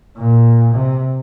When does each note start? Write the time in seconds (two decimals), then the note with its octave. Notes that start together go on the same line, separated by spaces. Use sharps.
0.16 A#2
0.74 C3